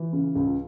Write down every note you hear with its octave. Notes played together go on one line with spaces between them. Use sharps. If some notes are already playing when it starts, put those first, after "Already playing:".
Already playing: E3
C#3
C#2